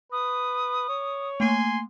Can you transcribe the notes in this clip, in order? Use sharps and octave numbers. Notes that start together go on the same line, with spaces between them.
B4 D#6
C#5
A3 A#3 G#5 C6